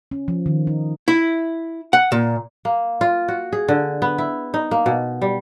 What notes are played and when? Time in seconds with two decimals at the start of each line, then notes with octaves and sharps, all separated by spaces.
0.11 C#4
0.28 F3
0.46 D#3
0.67 D#4
1.08 E4
1.93 F#5
2.12 A#2
2.65 A#3
3.01 F4
3.28 F#4
3.53 G#4
3.68 D3
4.02 B3
4.18 E4
4.54 D#4
4.71 A#3
4.86 B2
5.22 G3